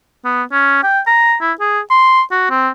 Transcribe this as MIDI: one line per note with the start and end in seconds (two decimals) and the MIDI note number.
0.25 0.43 59
0.52 0.81 61
0.83 1.00 79
1.07 1.35 82
1.41 1.53 64
1.60 1.80 68
1.90 2.22 84
2.31 2.49 66
2.50 2.69 60